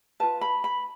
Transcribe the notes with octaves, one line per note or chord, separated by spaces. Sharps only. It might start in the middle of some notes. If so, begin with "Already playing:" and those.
F4 B4 A5
B5
B5